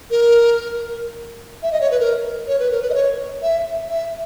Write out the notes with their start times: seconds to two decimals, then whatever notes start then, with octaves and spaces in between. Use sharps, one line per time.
0.11 A#4
1.63 E5
1.72 D#5
1.81 C#5
1.91 B4
2.00 A#4
2.47 C#5
2.59 B4
2.71 A#4
2.82 B4
2.90 D#5
2.94 C#5
3.42 E5
3.89 E5